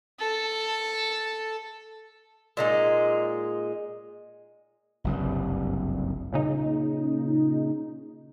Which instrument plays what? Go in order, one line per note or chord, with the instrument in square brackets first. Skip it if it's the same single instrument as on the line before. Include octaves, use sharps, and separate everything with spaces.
[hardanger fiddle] A4
[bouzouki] A#2 G#3 D#4
[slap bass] F#1 C2 G2
[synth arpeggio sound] A#2 C#3 D#4